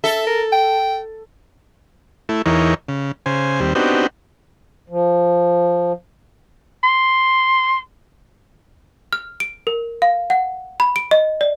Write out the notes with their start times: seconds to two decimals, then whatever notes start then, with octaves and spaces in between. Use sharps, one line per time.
0.04 A4 E5
0.27 A#4
0.52 G5
2.29 A3 E4
2.46 E2 E3 D#4 A#4 C#5
2.89 C#3
3.26 C#3 C5 G#5
3.60 D#2 G3 C4
3.75 B3 C4 D4 D#4 F#4 G4
4.90 F3
6.83 C6
9.13 F6
9.40 D7
9.67 A#4
10.02 F5
10.30 F#5
10.80 B5
10.96 D7
11.11 D#5
11.41 D5